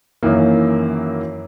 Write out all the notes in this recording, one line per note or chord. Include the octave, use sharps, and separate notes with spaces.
F#2 D#3 E3 A#3